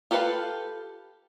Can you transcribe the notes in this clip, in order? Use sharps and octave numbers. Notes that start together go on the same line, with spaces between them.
F4 G4 A4 B4 F5